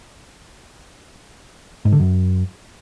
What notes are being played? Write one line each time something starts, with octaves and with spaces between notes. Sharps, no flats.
G#2
D3
F#2